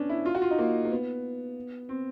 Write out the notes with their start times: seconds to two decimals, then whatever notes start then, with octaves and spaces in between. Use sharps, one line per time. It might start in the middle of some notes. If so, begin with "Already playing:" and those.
Already playing: B3 C#4 D4
0.09 E4
0.25 F4
0.35 F#4
0.42 F4
0.51 D#4
0.59 A#3
0.85 A#3
0.91 B3
1.89 C4